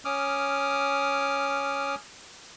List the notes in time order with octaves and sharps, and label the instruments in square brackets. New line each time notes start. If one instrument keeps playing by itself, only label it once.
[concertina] C#4 D6 D#6 F6